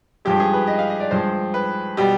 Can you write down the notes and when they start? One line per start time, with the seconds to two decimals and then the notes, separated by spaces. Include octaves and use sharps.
0.25 G2 F3 G#3 G4
0.40 G#4
0.53 B4
0.67 D#5
0.79 F5
0.90 D#5
1.00 D5
1.11 G2 F3 G#3 C5
1.54 B4
1.97 B2 G3 G4